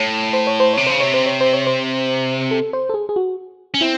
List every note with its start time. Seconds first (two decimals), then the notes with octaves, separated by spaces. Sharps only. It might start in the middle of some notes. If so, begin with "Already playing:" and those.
Already playing: A2 C#5
0.33 C5
0.47 C#5
0.60 C5
0.73 C3 C#5
0.87 C#3 C5
1.00 C3 C#5
1.14 C5
1.26 C#5
1.41 C5
1.53 C#5
1.67 C5
2.51 A4
2.73 C5
2.89 A4
2.94 G#4
3.09 G#4
3.16 F#4
3.74 C#4
3.81 C4 E4